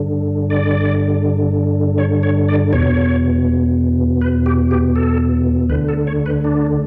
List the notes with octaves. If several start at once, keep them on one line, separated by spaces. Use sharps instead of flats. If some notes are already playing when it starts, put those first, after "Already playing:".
Already playing: G2 D3
D5
C#5
C#5
D5
E2 B2 C#5
B4
G4
G4
A4
D2 D3 B4
A4
C#5
B4
D4